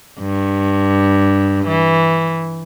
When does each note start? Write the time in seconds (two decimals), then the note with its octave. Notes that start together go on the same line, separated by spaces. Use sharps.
0.20 G2
1.67 E3